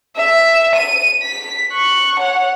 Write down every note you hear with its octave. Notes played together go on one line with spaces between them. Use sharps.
E5
D#7
B6
C#6 F#6
C#5 F#5